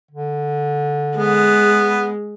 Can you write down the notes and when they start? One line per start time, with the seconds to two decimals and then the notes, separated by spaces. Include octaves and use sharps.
0.11 D3
1.17 G#3 B3